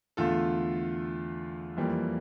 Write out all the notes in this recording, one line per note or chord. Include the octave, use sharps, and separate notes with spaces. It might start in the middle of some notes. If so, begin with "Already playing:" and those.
E2 D3 A3 F4 A4
F2 E3 G3 A#3